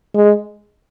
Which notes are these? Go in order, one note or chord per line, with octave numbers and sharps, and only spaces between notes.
G#3